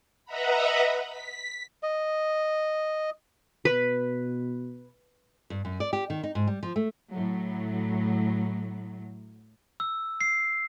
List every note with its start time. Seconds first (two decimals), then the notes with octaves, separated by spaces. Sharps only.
0.25 B4 D#5 E5 F#5 A#5 B5
1.06 B6
1.83 D#5
3.65 B2 B4
5.50 G2
5.65 F#2
5.80 D5
5.93 G4
6.10 D#3
6.23 D#4
6.35 G#2
6.47 G3
6.63 F3
6.76 A3
7.10 A2 F#3
9.80 E6
10.21 C7